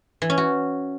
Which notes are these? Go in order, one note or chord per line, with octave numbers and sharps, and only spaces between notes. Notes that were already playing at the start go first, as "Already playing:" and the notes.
E3
C#4
F#4